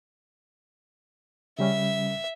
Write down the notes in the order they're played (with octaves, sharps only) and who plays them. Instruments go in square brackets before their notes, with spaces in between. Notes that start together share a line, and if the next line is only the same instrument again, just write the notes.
[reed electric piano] C#3 G3 C#4 [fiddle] E5